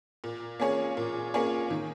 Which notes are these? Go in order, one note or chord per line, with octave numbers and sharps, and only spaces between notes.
A#2
A#3 C#4 G#4 C#5
A#2
A#3 C#4 G#4 C#5
D#3